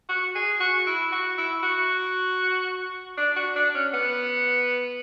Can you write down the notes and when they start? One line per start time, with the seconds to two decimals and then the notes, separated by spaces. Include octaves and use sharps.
0.09 F#4
0.35 G#4
0.61 F#4
0.87 E4
1.12 F#4
1.38 E4
1.63 F#4
3.17 D4
3.36 F#4
3.56 D4
3.75 C#4
3.94 B3